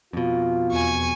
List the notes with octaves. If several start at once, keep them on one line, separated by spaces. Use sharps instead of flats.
F2 B2 F4
E2 G#5 C#6